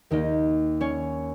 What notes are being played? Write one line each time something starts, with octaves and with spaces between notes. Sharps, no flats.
D#2 D#3 A#3 D#4 D#5
C#4 C#5